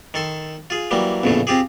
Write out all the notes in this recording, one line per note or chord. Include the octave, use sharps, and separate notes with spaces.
D#3 A4 C6
F4 G#4
E3 F#3 G3 A#3
A#1 E2 A2 C#3 A3
C4 F4 G4 G#4